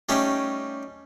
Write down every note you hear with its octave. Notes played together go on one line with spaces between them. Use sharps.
G3 A3 C#4 D#4 G4